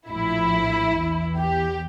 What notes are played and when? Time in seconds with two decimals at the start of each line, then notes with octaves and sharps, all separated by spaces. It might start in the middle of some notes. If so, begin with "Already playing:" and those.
0.09 A#1 A2 F3 E4
0.95 E2 E3
1.38 G4